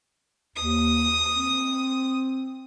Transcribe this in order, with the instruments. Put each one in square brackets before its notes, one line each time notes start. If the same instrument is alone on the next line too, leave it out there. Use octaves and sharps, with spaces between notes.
[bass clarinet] D#2 [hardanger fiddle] D#6
[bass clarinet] C4